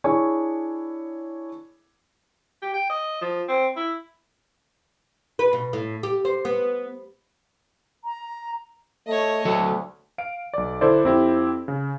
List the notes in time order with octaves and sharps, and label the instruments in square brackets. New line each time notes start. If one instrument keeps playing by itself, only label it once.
[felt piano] D4 E4 G#4 C#5 G#5 C#6
[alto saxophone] G4
G5
D#5
F3
C4
E4
[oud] B4
B2
A2
G4
C5
B3
[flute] A#5
[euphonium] A3 [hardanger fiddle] C#5 D#5
[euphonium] D2 [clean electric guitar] F#3 A3 A4
[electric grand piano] F5 D7
B1 D5
D3 D4 E4 A4 C5 D5
F2 C4 E4 G4
C#3